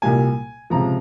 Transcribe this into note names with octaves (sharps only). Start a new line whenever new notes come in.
C2 A#2 G3 A#3 G#5
C#2 C3 F3 A#5